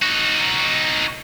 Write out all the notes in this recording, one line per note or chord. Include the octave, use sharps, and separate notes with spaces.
D#4 F#4